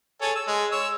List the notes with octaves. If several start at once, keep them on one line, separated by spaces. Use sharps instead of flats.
G#4 A4 C#5
E6
G#3
C#5 E6